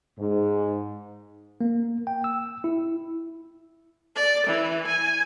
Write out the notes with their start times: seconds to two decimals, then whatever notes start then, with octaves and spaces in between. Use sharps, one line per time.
0.19 G#2
1.61 A#3
2.07 G5
2.24 E6
2.64 E4
4.16 D5
4.47 E3
4.87 G#5